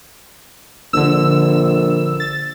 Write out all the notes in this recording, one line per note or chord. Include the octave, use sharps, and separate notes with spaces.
A#1 D3 E6
A6